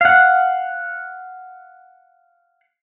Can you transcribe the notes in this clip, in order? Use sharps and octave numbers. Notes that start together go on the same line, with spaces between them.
F5 F#5